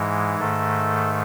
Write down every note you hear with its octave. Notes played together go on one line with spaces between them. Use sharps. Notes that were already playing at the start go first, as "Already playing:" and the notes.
Already playing: G#2 E3 G#3
G#2 D#3 A3 A4